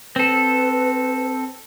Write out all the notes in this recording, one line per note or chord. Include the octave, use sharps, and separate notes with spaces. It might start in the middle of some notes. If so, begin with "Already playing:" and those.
C4 A4 B4